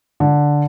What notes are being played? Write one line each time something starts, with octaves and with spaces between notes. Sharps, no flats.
D3